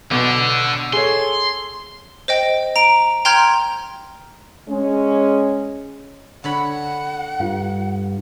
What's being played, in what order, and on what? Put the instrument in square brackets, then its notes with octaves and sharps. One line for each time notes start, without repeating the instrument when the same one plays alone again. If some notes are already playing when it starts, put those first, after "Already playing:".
[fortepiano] B1 [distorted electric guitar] D3
[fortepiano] G#4 A4 C#5 [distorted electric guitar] C6
[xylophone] C5 D#5 G5
A#5 D7
G5 A#5 C6 F6 G6 G#6
[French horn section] G#3 C#4
[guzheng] D3 C#5 B5 [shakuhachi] F#5
[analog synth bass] G2 [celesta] F4 F5